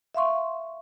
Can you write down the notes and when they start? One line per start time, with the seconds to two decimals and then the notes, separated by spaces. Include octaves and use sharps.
0.15 E5 F5 C6 C#6